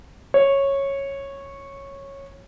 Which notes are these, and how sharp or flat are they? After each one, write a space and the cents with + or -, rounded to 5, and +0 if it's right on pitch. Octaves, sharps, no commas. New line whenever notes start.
C#5 -10